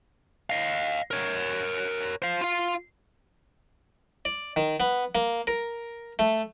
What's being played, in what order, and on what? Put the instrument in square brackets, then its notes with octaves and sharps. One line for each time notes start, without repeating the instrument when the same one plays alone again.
[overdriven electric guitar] D#5 F5
A#4 C#5
C5 F5
F4 F5
[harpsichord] D5
D#3
B3
A#3
A#4
A3